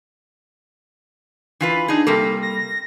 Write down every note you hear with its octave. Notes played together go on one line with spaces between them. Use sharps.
E3 F4 B4
D4 D#4 G#4
C3 G3 A#3 A4
A#6